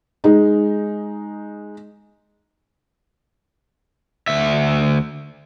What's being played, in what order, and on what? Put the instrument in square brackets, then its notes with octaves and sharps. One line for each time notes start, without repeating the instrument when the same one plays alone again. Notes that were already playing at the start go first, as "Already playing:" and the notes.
[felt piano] G#3 D#4
[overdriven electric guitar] D2 E5